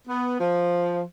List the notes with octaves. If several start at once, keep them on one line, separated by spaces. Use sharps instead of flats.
B3
F3